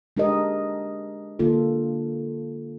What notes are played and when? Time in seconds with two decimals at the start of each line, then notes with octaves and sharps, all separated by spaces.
0.17 G#3 D4 G4 A#4 D#5
1.39 D3 A#3 F4 A4